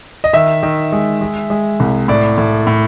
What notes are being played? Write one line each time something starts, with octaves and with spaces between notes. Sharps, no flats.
D#5
D#3 E5
D#3
G#3
G#3
G#3
C2
A2 D5
A2
A2